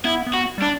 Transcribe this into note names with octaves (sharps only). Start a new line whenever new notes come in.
B3 E4
B3
F#4
G3 D4